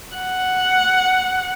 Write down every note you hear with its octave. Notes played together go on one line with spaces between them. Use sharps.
F#5